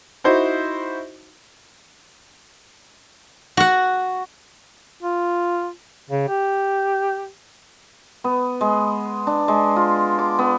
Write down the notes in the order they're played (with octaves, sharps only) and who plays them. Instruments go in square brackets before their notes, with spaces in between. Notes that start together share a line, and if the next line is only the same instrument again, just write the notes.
[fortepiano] D#4 E4 F#4 C5
[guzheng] F#4 F#5
[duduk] F4
C#3
G4
[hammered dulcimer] B3
G#3
D4
G#3
F4
D6
B3